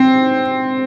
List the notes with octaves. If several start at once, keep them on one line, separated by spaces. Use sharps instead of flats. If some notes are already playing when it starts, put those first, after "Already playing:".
Already playing: C4